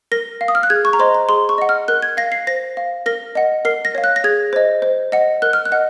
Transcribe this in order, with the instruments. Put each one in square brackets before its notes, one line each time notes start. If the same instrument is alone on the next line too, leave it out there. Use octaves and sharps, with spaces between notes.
[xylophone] A#4 A#6
F5
D#6
F6
F#6
G#4 G#6
C#6
A#5
C5 D#5 C6
A#5
G#4 C6
C#6
D#5 F#5
F6
A#4 F#6
G#6
F5 A#6
C7
C5 A#6
F5
A#4 A#6
D#5 F#5
A#4 C7
A#6
C#5 F5
F#6
A#6
G#4 G#6
C5 D#5
C5
D#5 F#5
A#4 F#6
F6
F#6
D#5 F#5